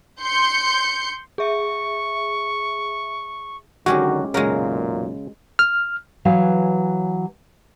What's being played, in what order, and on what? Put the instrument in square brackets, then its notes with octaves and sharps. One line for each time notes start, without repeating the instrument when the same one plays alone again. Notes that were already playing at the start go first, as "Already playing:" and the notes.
[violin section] C6 G6 C#7
[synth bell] G#4 E5 [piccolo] C#6
[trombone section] D3 D#3 F#3 [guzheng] G#3 C#4 G4 [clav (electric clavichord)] F#4
[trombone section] B1 F#2 A#2 [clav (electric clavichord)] C#3 [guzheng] G#3 F#4 A#4
[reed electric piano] F6
[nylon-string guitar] E3 F#3 C#5 F5 G#5